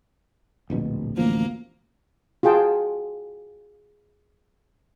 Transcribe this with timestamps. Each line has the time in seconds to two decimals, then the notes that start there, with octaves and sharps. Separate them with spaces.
0.70 D1 A#1 B2
1.17 A1 D2 F3 A#3
2.43 F4 F#4 G#4 G5 A5